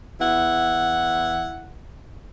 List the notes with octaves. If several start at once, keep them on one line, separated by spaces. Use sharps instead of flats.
E2 E4 F#5